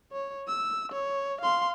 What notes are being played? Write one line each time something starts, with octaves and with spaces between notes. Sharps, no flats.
C#5
E6
C#5
F5 C6